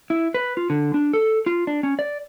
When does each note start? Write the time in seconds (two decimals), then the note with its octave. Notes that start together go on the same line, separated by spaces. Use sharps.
0.10 E4
0.34 B4
0.57 F4
0.70 D3
0.94 D4
1.13 A4
1.46 F4
1.67 D4
1.83 C#4
1.99 D5